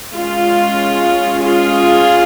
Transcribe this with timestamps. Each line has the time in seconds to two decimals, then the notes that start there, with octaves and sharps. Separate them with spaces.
0.15 G#3 C#4 F4
1.41 F4 G#4